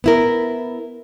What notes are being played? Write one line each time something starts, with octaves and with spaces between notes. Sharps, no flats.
B3 E4 A#4